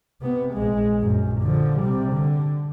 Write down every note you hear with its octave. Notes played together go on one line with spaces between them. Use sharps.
C3 B3
A#1 G#3
A#1 F#2
D3 F3
C3 G3
D3